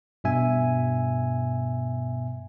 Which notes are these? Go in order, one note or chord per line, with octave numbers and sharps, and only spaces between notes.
G2 B2 E5 G#5